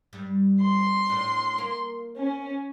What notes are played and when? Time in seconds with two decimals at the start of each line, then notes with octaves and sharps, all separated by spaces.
0.13 G2
0.62 C6
1.09 A2 D4
1.58 A#3
2.17 C#4